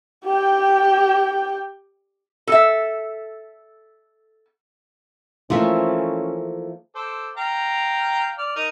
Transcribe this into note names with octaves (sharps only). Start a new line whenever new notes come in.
G4 G5
A4 E5
E3 F3 A3 A#3 C#4 F4 E5
A4 C5 D6
F5 G5 A#5
D5 F6
D#4 A#4 D#5